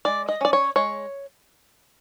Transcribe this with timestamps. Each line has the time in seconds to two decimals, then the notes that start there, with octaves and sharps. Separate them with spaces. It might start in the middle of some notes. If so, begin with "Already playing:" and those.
0.05 G#3 D5
0.29 D#5
0.41 C#4 D5
0.53 C#5
0.76 G#3 C#5